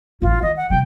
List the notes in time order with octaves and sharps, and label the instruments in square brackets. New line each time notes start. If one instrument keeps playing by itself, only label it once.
[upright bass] A1 F#2 [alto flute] F4
[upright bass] D#3 [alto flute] D#5
[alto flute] F#5
[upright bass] C3 F#3 [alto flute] G5